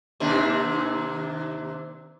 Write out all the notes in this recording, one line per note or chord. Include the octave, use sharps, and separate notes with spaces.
D#2 C3 D4